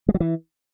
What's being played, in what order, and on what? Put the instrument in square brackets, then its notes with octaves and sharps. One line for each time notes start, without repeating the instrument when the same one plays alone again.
[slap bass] G#3
F#3
E3